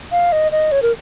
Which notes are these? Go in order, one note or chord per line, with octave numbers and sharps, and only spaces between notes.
F5
D#5
D#5
C#5
A#4